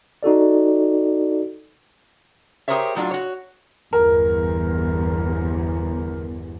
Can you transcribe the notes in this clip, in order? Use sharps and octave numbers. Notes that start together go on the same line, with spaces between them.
D#4 F#4 A4 D5
G4 G#4 A#4 C5 C#5 E5
A2 F#3 D4 F4
F#4 C#5
G1 E2 A#4